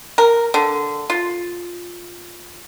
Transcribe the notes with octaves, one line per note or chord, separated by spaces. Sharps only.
A#4
D3
F4